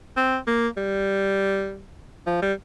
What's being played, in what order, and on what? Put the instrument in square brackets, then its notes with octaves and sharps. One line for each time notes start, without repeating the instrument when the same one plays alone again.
[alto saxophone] C4
A#3
G3
F3
G3